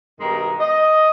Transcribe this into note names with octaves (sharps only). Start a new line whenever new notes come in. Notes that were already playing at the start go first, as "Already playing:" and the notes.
G2 B2 D#3 G#3 G5 A#5
D#5